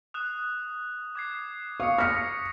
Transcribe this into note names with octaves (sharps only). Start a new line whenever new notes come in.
D#6 F#6 E7
D6 G#6 C7
F5 C#6 D#6 C#7
F6 A#6 B6 C#7